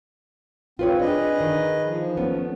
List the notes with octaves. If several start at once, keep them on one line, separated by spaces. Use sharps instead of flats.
C4 F4 B4 C#5
D4 G#4 B4 D#5
D#3
F3
A3 B3 C#4